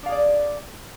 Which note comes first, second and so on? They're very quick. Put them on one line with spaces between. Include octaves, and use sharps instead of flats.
D4 F5 G#4 D5